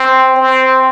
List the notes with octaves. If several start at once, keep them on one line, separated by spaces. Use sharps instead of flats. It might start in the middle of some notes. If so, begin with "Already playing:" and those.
Already playing: C4
C4